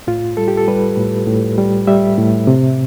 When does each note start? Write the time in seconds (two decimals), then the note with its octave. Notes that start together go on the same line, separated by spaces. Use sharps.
0.07 A2 F4
0.37 G3 A4
0.48 G4
0.57 A4
0.68 G3 B4
0.97 A2
1.27 A2
1.58 G3
1.87 G3 E5
2.18 A2
2.47 C3